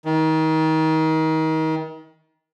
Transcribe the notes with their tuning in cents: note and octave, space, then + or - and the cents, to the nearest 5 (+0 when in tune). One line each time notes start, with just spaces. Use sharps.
D#3 +30